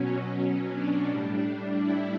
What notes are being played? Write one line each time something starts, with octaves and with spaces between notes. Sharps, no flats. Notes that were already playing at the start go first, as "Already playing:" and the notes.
Already playing: B2 F#3 C#4
D4
A2 G3
E4